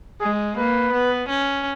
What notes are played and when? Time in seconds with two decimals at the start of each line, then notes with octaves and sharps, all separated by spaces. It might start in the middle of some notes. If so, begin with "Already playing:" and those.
0.21 G#3 G#4
0.57 A#3 B4
0.93 B3
1.29 C#4